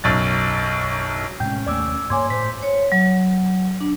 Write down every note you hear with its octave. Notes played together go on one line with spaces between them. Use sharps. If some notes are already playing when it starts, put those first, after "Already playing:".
B1 F#2 A6
A2 C3 G#3 C#4 G5 G6
D#2 G#3 A3 D5 D6 E6
G2 A#3 C#5 G#5 C6 D6 G#6
A2 C5 B6
C#5
F#3
D4